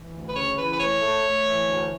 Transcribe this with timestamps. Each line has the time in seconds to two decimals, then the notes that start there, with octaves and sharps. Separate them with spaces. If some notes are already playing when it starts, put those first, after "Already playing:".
Already playing: E3
0.12 D2
0.27 B4
0.34 C#3 C#5
0.56 E3 B4
0.71 B4
0.78 A3 C#5
1.01 A3
1.23 A3
1.44 E3
1.66 D2